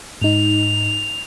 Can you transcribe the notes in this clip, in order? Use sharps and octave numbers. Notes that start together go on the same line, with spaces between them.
G#2 D#4 F7